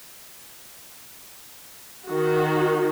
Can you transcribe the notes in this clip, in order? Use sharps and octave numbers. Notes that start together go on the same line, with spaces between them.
D#3 F#4